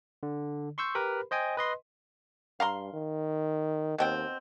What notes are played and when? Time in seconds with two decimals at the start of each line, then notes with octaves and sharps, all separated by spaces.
0.23 D3
0.78 C6 C#6 E6 G6
0.95 G4 A#4 B4 B5
1.31 C5 D#5 G5 G#5
1.57 B4 D#5 C6
2.60 G2 F5 A#5 C6
2.93 D#3
3.98 D#2 B2 C4 G5